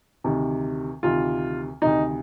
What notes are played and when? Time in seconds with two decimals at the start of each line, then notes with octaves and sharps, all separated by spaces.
0.24 D2 C3 D#3
1.03 D2 C3 D#3 F4
1.82 D2 C3 D#3 D#4